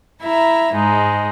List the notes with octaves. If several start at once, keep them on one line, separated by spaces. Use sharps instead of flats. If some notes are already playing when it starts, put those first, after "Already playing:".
E4 E5 A#5
G#2 G#3 D#4